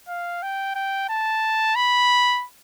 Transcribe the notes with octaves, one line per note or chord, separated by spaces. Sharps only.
F5
G5
G5
A5
B5